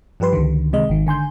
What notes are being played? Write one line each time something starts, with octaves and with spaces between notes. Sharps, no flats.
G2 F3 G4 B4 C6
C#2 D3 D#3
C3 D#3 G#3 D#5
G#1 D#3
D3 G#5 C6 G6